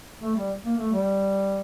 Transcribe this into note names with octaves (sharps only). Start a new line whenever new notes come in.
A3
G3
A#3
A3
G3